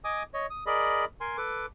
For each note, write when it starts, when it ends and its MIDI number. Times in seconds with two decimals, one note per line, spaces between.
0.04 0.23 75
0.04 0.23 80
0.04 0.23 86
0.04 0.23 87
0.34 0.46 73
0.34 0.46 75
0.50 0.64 87
0.66 1.05 68
0.66 1.05 70
0.66 1.05 74
0.66 1.05 75
0.66 1.05 83
1.21 1.37 70
1.21 1.37 80
1.21 1.37 84
1.37 1.66 69
1.37 1.66 71
1.37 1.66 86